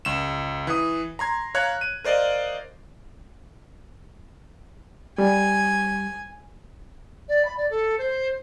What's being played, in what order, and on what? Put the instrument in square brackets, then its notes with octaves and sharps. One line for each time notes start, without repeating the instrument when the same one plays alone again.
[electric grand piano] C#2 E7
E3 D#6
A#5 C6 G#6
C#5 F5 A#5 F#6 G#6
D#7
A#4 C5 D5 D#5 F5
[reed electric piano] G3 [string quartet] G#5
[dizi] D5
B5
D5
A4
C5